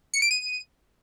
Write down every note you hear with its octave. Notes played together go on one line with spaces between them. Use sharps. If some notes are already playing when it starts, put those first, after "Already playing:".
C#7
D7
D#7